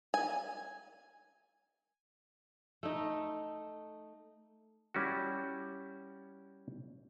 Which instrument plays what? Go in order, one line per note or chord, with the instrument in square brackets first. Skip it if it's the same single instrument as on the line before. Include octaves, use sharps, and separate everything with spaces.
[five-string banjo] G#5
[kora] A3 D#4
[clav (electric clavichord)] G3 C#4 E4 F#4